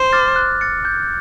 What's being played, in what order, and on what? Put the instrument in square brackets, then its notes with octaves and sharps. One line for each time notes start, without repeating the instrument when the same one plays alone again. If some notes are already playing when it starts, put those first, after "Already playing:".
Already playing: [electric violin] C5
[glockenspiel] D6 F6 A6
F#6
A6 C#7
G6